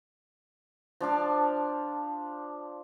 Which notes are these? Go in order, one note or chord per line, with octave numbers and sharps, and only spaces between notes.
F3 D4 F5 A5